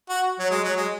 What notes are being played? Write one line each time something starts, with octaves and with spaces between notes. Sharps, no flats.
F#4
F#3
G#3
F#3
G#3